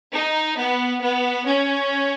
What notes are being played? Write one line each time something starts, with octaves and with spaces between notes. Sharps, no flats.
D#4
B3
B3
C#4